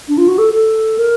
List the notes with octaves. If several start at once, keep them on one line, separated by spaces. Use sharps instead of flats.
D4
F4
F#4
A4
A4
A#4